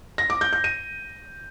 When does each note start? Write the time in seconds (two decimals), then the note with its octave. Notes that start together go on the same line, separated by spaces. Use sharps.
0.18 A#6
0.30 D6
0.41 G6
0.53 G6
0.64 D#7